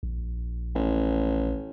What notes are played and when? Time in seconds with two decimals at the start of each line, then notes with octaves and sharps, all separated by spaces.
0.03 A#1
0.75 A1